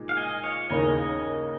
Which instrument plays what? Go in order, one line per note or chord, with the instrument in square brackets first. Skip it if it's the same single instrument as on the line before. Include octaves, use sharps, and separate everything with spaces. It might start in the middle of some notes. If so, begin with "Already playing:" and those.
Already playing: [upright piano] A#2 G#3 D#4
[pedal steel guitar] F5
D#5 G#5
C#5 F5
[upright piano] D#2 C#3 A#3 D#4 [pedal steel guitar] D#5 G#5